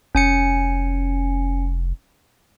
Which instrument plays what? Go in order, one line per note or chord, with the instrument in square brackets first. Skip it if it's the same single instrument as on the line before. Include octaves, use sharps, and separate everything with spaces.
[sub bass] F1 [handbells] C#4 G#5 C#7